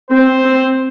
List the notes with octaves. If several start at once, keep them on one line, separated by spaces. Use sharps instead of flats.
C4 C5
C4